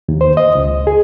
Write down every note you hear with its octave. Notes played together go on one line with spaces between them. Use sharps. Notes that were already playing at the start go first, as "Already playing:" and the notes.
D#2
C5
D#5
C#2
G#4